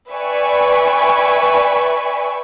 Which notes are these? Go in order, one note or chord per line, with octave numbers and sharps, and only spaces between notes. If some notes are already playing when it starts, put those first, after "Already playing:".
B4 D5 E5 G5 G#5 C#6